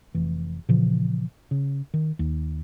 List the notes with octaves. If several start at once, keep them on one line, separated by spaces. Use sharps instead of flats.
F1 E3
A#2 C#3 E3 F3
C#3
D#3
D#2